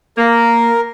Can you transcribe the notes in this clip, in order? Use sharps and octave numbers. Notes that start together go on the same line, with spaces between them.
A#3 A#4